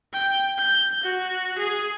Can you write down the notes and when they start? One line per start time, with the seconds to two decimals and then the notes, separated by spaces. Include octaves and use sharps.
0.13 G5
0.59 G6
1.03 F#4
1.59 G#4